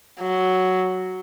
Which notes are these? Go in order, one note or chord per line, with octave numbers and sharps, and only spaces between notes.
F#3